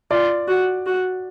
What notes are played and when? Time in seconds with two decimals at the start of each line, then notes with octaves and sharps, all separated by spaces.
0.11 F4 D5
0.48 F#4
0.86 F#4